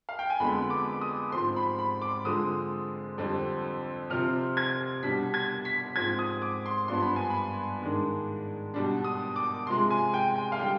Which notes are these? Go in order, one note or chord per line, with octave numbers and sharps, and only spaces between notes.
F5
G5
G#5
F2 D3 G#3 B3 B5
D6
D#6
G#2 F3 C4 C6
B5
B5
D6
D3 F3 G#3 C4 D#6
F2 D3 G3 C4
C3 F3 C4 F6
G#6
B2 G3 D4 B6
G#6
B6
G#2 F3 C4 G#6
D#6
D6
C6
G2 F3 B3 D4 C6
B5
G#5
B5
G#2 D#3 G#3 D4
B2 G3 D4
D#6
D6
C3 F3 G#3 C6
G#5
G5
G5
F5
D3 G3 G5